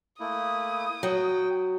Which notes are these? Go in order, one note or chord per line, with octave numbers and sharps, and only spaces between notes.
A3 A#3 E4 D#6
F#3 G5